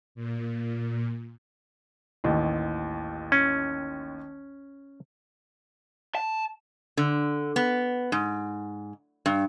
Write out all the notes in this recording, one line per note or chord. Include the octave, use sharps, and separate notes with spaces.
A#2
A1 D#2
C#4
A5
D3
B3
G#2
G2